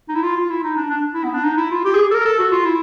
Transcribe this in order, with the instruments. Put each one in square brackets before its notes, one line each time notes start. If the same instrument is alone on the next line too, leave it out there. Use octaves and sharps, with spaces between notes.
[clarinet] D#4
E4
F4
F4
E4
D#4
D4
D4
E4
B3
D4
D#4
E4
F4
G4
G#4
A4
A#4
A4
F#4
F4
E4